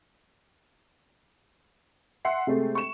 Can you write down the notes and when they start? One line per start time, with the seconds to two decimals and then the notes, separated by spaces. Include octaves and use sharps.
2.25 E5 F#5 C6 C7
2.47 C3 G#3 A3
2.75 C#6 E7